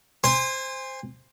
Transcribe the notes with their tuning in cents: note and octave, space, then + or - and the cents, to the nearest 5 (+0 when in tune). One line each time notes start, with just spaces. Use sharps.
C5 +0 G#5 -35 C6 +0